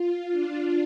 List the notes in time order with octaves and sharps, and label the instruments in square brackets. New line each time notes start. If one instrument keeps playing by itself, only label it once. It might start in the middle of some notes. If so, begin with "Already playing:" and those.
Already playing: [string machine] F4
D4